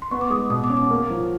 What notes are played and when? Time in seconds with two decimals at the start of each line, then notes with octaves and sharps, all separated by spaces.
0.02 C6
0.11 B3 C#6
0.21 D6
0.30 G#3 D#6
0.50 B2 D#6
0.64 D6
0.70 C#4
0.77 D6
0.90 A#3
1.10 F3